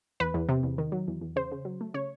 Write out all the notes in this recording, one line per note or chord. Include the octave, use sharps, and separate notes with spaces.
E2 B4
E2
C3
E2
D#3
F#3
E2
E2
C#3 C5
C#3
F#3
A3
C#3 C#5